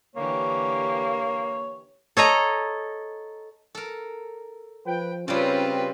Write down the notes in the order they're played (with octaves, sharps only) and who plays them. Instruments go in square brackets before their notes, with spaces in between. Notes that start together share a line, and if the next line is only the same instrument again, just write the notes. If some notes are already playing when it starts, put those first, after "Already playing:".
[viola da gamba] D3 E3 G4 [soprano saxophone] A#3 [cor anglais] C#5
[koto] A4 C#5 D#5 A#5
[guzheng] A4 A#4
[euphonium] F3 [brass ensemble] B4 G5
[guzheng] C#3 G3 [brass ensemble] C4 [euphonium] C#4 [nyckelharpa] F4 B4